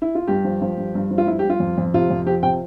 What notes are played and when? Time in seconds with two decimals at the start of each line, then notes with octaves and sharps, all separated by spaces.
0.02 E4
0.15 F4
0.27 G2 G4
0.45 F3
0.62 F3
0.77 G2
0.95 G2
1.11 F3
1.18 F4
1.27 G2 E4
1.39 G4
1.45 G2
1.50 F4
1.60 F2
1.78 F2
1.94 C3 F4
2.10 F2
2.26 F3 G4
2.43 C3 G5